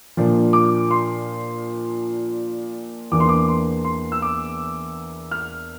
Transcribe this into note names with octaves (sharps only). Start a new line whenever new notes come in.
A#2 F3 A#3 D4
D6
C6
E2 E3 A#3 D4 D6
C6
D6
C6
C6
E6
D6
F6